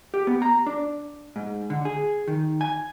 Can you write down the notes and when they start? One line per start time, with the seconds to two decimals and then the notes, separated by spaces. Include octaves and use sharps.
0.14 G4
0.27 B3
0.42 A#5
0.66 D4
1.36 G#2
1.70 D3
1.85 G#4
2.28 D#3
2.61 G#5